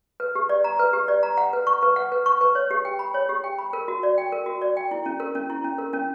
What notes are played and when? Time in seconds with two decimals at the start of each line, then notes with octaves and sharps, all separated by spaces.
0.20 B4
0.35 G4
0.49 D5
0.64 A#5
0.79 B4
0.93 G4
1.08 D5
1.23 A#5
1.38 F#5
1.53 B4
1.67 C#6
1.83 B4
1.96 F#5
2.12 B4
2.26 C#6
2.41 B4
2.55 C#5
2.71 G4
2.85 G5
2.99 B5
3.14 C#5
3.29 G4
3.44 G5
3.58 B5
3.73 A#4
3.88 F#4
4.03 D5
4.18 G5
4.32 A#4
4.46 F#4
4.62 D5
4.77 G5
4.91 E4
5.06 C#4
5.20 A#4
5.35 C#4
5.50 E4
5.64 C#4
5.78 A#4
5.93 C#4